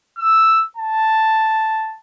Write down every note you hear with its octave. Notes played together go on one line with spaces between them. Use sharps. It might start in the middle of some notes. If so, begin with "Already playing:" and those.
E6
A5